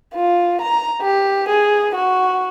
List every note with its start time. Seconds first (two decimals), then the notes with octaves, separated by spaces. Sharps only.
0.14 F4
0.61 A#5
1.02 G4
1.49 G#4
1.95 F#4